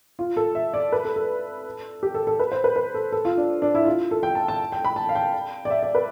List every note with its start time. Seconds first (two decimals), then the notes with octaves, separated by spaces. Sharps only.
0.19 F4
0.37 A4
0.55 E5
0.74 D5
0.92 B4
1.05 A4
1.16 A4
2.03 G4
2.15 A4
2.27 A4
2.39 B4
2.52 C5
2.64 B4
2.76 B4
2.94 A4
3.12 A4
3.25 F4
3.37 D4
3.62 D4
3.75 E4
3.86 F4
4.11 A4
4.23 G5
4.35 A5
4.48 A5
4.72 G5
4.85 B5
4.96 A5
5.09 F5
5.15 G5
5.65 D5
5.70 E5
5.83 D5
5.95 B4